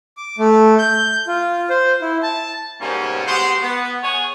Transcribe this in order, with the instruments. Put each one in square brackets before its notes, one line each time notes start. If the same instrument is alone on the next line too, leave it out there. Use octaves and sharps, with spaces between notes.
[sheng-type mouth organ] D6
A3
G6
F4
C5
E4
A5
[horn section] G#2 B2 G3 A#3 C4 C#4
G#3 B3 F#4 G4 C5
B3
G#4 C#5 F#5